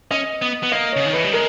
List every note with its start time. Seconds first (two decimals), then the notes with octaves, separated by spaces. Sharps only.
0.11 C#4 D#5
0.42 B3
0.63 B3
0.72 A#3 D#5
0.93 C#3 C#5
1.06 D#3
1.13 E3 B4
1.24 G3
1.33 G#3 A#4